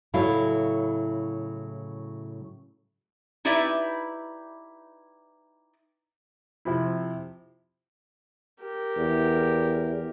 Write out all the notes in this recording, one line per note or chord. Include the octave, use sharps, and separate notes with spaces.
A2 C#3 F#3 E4 A4 F5
D#4 E4 G4 B4 D5 E5
C3 F3 E4
G4 A#4
E2